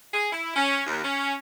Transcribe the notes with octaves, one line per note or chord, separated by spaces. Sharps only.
G#4
E4
C#4
D#2
C#4